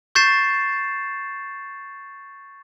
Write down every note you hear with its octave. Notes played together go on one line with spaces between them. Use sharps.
C#6 G6 A6 C7 E7